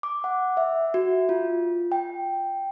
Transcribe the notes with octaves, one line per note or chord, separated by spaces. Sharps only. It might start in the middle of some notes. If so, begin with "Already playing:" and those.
D6
F#5
E5
F#4
F4
G5